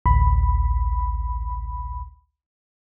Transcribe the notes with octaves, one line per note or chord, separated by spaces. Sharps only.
A1 D2 B5